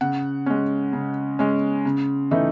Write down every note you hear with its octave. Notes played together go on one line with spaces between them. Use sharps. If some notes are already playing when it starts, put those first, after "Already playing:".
C#3 F#5
G#3 C#4
C#3
G#3 C#4
C#3
E3 A3 D#4